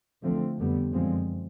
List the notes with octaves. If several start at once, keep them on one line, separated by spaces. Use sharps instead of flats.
D3 F3 A3 C4
F2 D3 G3 B3
F#2 D3 F3 G#3 C4